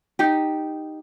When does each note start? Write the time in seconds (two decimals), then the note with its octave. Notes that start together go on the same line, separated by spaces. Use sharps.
0.19 D#4 G4